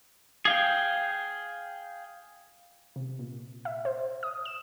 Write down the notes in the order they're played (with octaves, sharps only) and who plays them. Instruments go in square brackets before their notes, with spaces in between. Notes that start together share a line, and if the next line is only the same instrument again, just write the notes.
[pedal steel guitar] G#4 F5 G5
[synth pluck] C3
A#2
E5
C5
D#6
E7